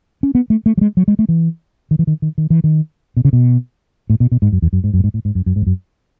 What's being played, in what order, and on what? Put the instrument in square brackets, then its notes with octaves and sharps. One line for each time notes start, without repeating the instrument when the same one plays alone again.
[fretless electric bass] C#4
B3
A3
A3
F#3
G#3
F#3
G#3
A3
E3
D#3
E3
D#3
D#3
D#3
E3
D#3
B2
C#3
B2
A2
B2
B2
G#2
F#2
E2
F#2
G#2
F#2
A2
G#2
A2
G#2
F#2
F#2
G#2
E2
F#2